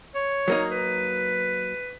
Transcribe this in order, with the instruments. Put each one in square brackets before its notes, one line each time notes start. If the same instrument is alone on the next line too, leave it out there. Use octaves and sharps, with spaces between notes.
[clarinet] C#5
[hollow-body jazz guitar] F#3 A#3 D#4
[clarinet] B4